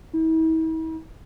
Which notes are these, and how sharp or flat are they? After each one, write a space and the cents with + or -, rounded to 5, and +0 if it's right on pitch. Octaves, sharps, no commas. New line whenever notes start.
E4 -45